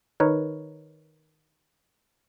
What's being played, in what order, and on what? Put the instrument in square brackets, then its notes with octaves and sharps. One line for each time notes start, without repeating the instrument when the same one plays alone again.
[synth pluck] D#3 D#4 A#4 B4 C#5